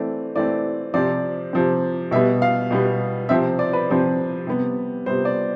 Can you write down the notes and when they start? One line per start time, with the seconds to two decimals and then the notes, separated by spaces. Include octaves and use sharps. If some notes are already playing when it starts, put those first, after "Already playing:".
Already playing: E3 A3 C4 D5
0.36 E3 A3 C4 D5
0.94 C3 F3 C4 D5
1.53 C3 F3 C4
2.11 B2 G3 B3 E5
2.42 F5
2.71 B2 G3 B3
3.29 C3 F3 C4 E5
3.59 D5
3.73 B4
3.89 C3 F3 C4
4.47 C3 G3 B3
5.06 C3 G3 B3 C5
5.25 D5